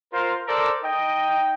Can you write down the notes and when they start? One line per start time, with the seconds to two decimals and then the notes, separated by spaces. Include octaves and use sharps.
0.12 F4 A#4 C5 F5
0.47 A4 A#4 C5 D5
0.83 D#4 D#5 G5